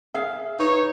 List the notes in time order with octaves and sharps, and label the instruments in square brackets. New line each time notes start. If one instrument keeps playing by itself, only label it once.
[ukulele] G#4 F5 [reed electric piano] E5
[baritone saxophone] D#4 [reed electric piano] B4 C#6 [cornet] C#5